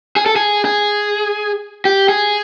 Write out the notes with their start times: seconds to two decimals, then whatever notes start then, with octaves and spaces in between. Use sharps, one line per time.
0.16 G#4
0.26 A4
0.36 G#4
0.65 G#4
1.85 G4
2.09 G#4